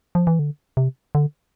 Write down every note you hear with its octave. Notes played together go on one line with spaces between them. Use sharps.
F3
E3
D3
C3
D3